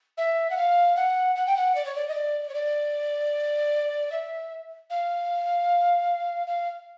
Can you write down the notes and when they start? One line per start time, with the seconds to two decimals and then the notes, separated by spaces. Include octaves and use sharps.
0.17 E5
0.50 F#5
0.57 F5
0.96 F#5
1.35 F#5
1.46 G5
1.56 F#5
1.75 D5
1.85 C#5
1.95 D5
2.08 D#5
2.14 D5
2.49 C#5
2.54 D5
4.12 E5
4.90 F5
6.47 F5